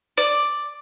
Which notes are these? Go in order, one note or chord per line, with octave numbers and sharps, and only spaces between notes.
D5